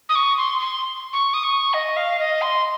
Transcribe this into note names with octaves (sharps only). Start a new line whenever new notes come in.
D#6
C#6
C6
C6
C#6
D#6
C#6
D#5
F5
D#5
C6